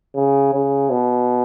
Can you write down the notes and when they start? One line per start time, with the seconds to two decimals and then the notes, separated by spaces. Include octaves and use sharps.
0.15 C#3
0.53 C#3
0.90 B2